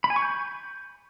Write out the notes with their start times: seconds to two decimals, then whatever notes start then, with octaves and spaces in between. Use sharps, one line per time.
0.04 B5
0.10 G#5
0.16 C#6
0.22 G6